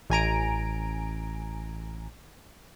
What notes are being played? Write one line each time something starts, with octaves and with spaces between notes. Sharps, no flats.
A1 G#5 A#5 D7